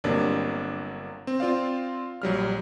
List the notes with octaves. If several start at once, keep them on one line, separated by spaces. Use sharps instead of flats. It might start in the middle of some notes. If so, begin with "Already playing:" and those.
G1 C3 F#3 A#3 D4
C4
C4 F4 D5 F5
A#1 F#3 G3 F6